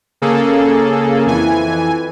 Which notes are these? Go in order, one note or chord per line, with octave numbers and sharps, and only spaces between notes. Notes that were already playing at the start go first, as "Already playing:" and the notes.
C#3 A#3 G#4 A4
F2 E3 G#5